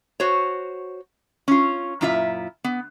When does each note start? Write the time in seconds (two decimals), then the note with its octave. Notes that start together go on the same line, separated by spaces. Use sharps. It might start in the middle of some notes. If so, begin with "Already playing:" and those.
0.20 F#4 C5 C#5
1.48 C#4 F4
2.01 F#2 A#2 E4 F4 G4 E5
2.64 B3